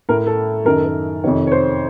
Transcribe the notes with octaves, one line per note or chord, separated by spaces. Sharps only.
A2 A#4
A4
F#2 D#3 A#4
A4
A#4
F2 C3 D#3 C#5
C#5
C5